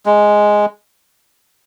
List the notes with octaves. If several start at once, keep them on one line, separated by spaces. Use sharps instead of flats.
G#3